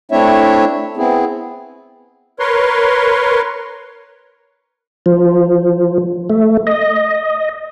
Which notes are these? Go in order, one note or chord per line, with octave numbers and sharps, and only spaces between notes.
A3 C4 D4 E4 C#5 E5
B3 C4 E4 G#4
A#4 B4 C#5 C6
F3
A3
D#5